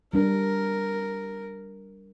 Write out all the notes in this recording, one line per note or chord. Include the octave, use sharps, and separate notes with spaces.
G3 D4 A#4